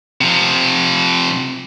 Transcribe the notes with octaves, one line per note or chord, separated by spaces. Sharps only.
C3 F3